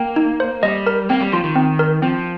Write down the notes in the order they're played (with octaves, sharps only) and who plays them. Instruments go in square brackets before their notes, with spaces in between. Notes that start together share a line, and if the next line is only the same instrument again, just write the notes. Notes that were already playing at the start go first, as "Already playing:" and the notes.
Already playing: [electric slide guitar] A#3 [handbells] G5
[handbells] D#4
C5
[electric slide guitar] G3 [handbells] D#5
[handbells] A#4
[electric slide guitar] A#3 [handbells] C4
[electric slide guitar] G3
[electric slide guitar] F3 [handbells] F4
[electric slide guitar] D#3
[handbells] C4
A#4
[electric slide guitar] F3 [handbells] C4